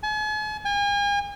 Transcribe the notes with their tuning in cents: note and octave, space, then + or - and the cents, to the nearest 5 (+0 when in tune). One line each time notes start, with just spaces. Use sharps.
G#5 +45
G#5 -40